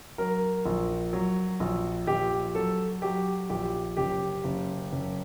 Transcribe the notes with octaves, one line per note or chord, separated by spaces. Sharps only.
F#3 A#4
A#1
F#3
A#1
A#1 G4
F#3 A4
F#3 G4
A#1 G4
F#1 G4
F#1
F#1